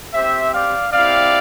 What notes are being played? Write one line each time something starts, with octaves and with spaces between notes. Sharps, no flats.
C4 G4 C5 E5
D5 F5
C4 E4 G4 D5 F5